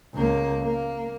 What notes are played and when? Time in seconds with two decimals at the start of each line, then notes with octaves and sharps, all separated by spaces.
0.15 C#2 A#3
0.63 A#3